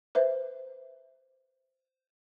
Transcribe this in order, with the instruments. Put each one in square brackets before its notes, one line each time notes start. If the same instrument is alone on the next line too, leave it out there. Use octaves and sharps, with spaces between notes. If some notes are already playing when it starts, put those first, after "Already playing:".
[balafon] B4 C5 E5